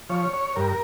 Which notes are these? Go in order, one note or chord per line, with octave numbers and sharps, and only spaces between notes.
F3 C#5
C#5
G2 A#4